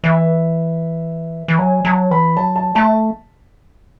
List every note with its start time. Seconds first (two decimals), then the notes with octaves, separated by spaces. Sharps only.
0.04 E3 E5
1.48 E3
1.59 F#3 G#5
1.85 F#3 A5
2.11 E3 B5
2.37 F#3 A5
2.56 A5
2.75 A3 A5